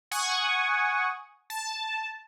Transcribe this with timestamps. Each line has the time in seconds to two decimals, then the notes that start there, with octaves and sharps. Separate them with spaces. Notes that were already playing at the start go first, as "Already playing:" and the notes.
0.11 F#5 G#5 C#6 D#6
1.50 A5